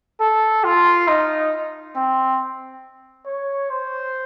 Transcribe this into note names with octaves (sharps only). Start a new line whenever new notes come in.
A4
F4
D#4
C4
C#5
C5